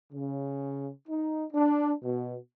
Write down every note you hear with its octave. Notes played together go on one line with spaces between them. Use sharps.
C#3
D#4
D4
B2